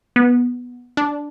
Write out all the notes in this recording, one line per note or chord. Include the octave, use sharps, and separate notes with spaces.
B3
D4